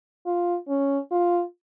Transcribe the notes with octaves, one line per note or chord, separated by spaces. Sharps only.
F4
C#4
F4